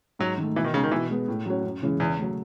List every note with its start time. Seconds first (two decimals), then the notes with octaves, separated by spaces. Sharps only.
0.19 G#2 F#3
0.38 D#3
0.43 A3
0.56 B2 E3
0.64 D#3
0.74 C#3 G#3 D#4
0.83 D#3
0.91 B2 E3
1.10 G#3 B3
1.28 A2
1.46 F#3 C#4 F#4 C#5
1.64 F#2
1.82 C#3 E3 G#3 C#4
2.00 E2 C#3
2.18 F#3 A3